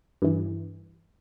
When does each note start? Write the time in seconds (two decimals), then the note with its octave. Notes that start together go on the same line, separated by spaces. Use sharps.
0.22 G2 E3